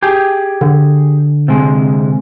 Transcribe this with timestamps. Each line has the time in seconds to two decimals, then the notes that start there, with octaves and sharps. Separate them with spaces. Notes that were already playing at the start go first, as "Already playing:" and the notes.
0.02 G4 G#4
0.61 D3
1.48 C3 G#3